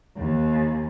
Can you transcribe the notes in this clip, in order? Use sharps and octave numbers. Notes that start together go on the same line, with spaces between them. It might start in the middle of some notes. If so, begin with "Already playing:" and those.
D#2